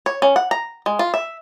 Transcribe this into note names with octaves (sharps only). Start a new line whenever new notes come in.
C#5
C#4
F#5
A#5
G#3
F4
E5